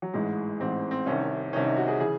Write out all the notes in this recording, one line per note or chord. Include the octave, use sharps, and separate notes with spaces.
F#3
A1 G#2 E3 G#3
A1 G#2 E3 C4
C4
C2 C3 D#3 C#4
C2 C3 D#3 C#4
D#4
F#4
G#4
C#3 E3 G#4